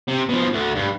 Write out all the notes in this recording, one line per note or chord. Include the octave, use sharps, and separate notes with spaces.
C3
B2 F3
D2 D3
G2